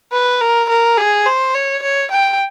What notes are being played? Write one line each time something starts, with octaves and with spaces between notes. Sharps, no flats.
B4
A#4
A#4
G#4
C5
C#5
C#5
G5